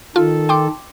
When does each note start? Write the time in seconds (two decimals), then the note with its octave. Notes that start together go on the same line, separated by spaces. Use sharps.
0.16 D#3 F4 A4
0.49 G5 C6 D6